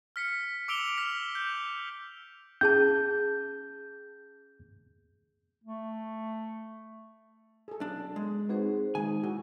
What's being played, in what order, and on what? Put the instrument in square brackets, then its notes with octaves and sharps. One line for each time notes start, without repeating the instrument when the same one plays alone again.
[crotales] F6 B6 C#7
D6 E6 D7 F7 G7
F6 B6 F7
G6
[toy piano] C#4 G#4 A5 [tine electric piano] G6
[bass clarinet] A3
[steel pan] G#4 A4
[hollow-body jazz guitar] B1 D4
G#3
[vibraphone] C4 G#4 C5 [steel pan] D#4 F#4 B4
[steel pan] D#3 G#3 [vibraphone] D#4 [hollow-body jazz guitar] G#5
[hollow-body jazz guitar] A#2 [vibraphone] E4 [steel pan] F#4